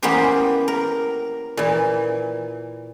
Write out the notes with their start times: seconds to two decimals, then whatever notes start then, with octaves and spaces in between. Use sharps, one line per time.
0.03 E3 A#3 B3 C#4 G4 C5
0.68 A#4
1.57 A#2 E3